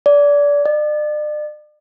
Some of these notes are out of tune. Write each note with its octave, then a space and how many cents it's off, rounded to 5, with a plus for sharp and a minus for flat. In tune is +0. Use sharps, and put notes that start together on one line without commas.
D5 -25
D5 +40